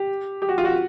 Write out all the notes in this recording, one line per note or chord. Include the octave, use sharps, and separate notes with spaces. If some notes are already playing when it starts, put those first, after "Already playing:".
Already playing: G4
G4
F#4
F4
F#4